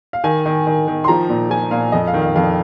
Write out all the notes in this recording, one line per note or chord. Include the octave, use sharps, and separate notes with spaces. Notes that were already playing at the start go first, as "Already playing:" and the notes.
F5
D#3 G#5
D#3
D#3
D#3
C6
F3 A#5
A#2
F3 G#5
A#2 F5
F2 D#5
F5
D#3
F5
F2 F5